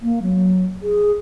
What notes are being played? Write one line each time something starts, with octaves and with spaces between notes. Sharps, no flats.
A#3
F#3
G#4